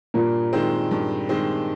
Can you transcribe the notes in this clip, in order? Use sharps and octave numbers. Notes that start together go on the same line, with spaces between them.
G2 A#2 A#3
D#3 G#3 C4
G2
D#3 G#3 C4